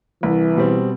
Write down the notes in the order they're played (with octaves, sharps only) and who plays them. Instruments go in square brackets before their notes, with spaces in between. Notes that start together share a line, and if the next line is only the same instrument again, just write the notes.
[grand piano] C2 [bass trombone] E3
[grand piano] B2 G3 C4